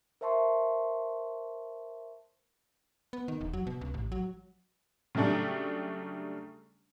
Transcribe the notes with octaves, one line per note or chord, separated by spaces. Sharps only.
A#4 C5 E5 A5 C6 C#6
B3
D#3
E1
F#3
B2
C#2
A1
F#3
C#3 F#3 G3 A3 D4